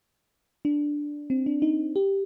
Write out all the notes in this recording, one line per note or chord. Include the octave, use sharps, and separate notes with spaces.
D4
C4
D4
D#4
G4